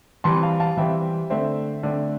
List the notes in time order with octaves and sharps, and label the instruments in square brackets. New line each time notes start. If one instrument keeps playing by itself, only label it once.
[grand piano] E3 G3 C4 A5 C6
F5 A5
F5 A5
E3 G3 C4 E5 G5
D3 A3 C4 C5 E5
D3 A3 C4